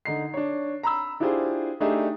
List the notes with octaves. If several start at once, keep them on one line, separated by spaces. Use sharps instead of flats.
D3 D#4 C7
D4 C#5
A#5 B5 E6
D4 E4 F4 G4 G#4 C5
A3 D4 D#4 G4 G#4 E5